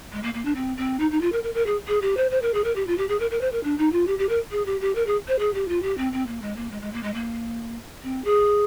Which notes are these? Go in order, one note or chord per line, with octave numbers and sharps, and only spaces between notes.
G#3
A#3
A#3
D4
C4
C4
D#4
D#4
F4
A#4
A#4
A#4
G#4
G#4
G4
C5
C5
A#4
G#4
A#4
G4
F4
G4
G#4
A#4
A#4
C5
A#4
D4
D#4
F4
G4
G4
A#4
G#4
G4
G4
A#4
G#4
C5
G#4
G4
F4
G4
C4
C4
A#3
G#3
A#3
G#3
G#3
A#3
G#3
A#3
C4
G#4